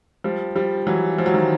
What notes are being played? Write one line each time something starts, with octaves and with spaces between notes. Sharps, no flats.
F3 G3
F3 G3
E3 F#3
F3
F#3
D#3 F3